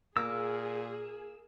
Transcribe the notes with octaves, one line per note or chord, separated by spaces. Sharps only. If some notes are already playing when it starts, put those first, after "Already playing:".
A#2 A#3 G#4 E6